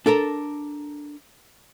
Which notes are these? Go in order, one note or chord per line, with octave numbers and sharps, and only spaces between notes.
D4 A4 A#4 A#5